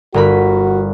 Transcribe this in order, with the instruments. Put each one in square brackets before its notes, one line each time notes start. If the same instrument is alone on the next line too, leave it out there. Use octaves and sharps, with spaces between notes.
[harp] G1 A#4 B5 [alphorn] F#4